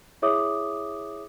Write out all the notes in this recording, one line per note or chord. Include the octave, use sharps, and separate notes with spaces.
E4 G#4 C#5 E5 D6 D#6